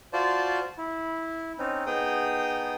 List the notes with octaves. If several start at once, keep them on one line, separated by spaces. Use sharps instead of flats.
F4 F#4 C5 D5 A5
E4
C4 C#4 D#4
B3 D#4 G#4 G5 D#6